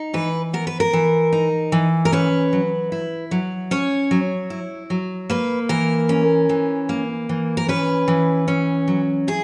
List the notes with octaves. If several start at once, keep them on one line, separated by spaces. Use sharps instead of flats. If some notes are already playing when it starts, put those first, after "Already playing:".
Already playing: D#4
E3 B4
B3 A#4
B4
A#4
E3
D#4
E3
A#4
C#4 B4
F#3
E4
F#3
C#4 C#5
F#3
E4
F#3
A#3 B4
E3 A#4
C#4
E3
A#3
E3
A#4
C#4 B4
E3
C#4
F#3
E4 G#4